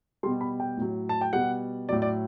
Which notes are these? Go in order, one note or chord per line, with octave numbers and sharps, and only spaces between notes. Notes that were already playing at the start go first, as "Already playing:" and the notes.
B2 G3 C6
B5
G5
A2 F#3
A5
G5
B2 G3 F#5
A2 F#3 D5
D5